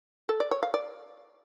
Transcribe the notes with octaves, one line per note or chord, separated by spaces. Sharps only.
A4
D5
C#5
F5
D5